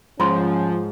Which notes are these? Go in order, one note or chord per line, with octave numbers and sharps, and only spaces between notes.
G#2 F3 C#4 F4 C6